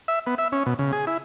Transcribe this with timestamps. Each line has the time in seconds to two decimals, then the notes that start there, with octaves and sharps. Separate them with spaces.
0.08 E5
0.27 B3
0.38 E5
0.52 C#4
0.66 B2
0.79 C#3
0.93 G#4
1.07 E4